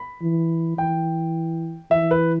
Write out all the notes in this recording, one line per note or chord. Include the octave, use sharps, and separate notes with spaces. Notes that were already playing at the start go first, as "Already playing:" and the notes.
Already playing: B5
E3
E3 G5
E3 E5
B4